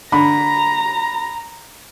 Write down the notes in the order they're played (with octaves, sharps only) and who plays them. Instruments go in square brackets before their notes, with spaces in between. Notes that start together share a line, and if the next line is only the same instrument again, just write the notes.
[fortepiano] D3 [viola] A#5 [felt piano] B5